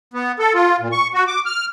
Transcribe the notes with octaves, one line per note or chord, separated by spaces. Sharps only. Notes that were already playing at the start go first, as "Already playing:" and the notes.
B3
A4
F4
A#2
C#6
F#4
D6
F6